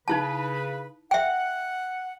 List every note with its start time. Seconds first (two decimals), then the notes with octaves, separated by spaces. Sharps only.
0.08 C#3 D#4 E4 B4 A5
1.11 E5 F#5 G5